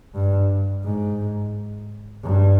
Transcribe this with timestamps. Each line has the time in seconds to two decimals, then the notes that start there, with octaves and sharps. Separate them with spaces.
0.15 G2
0.84 G#2
2.24 G2